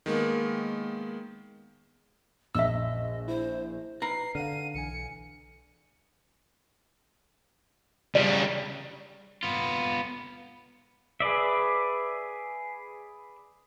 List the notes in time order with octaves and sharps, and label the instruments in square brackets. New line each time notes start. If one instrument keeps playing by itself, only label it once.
[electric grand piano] D#3 G#3 A#3 B3
[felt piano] A#1 [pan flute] D#5 [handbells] E5 E6
[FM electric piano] E4 [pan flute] C5
[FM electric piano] D#4 [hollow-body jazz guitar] B4 A#5 [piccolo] C7
[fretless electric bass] D3 [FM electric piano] F5 F#5 F6 [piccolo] D#7
[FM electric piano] B1 E3 G#5 [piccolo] C#7
[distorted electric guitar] C#3 G3 [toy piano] D5
[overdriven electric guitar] B3 F4
[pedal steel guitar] G#4 B4 D5 E5